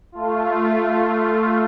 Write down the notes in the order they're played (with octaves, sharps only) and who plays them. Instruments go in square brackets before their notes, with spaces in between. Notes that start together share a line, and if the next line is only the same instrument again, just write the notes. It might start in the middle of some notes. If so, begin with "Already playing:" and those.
[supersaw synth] A3 F4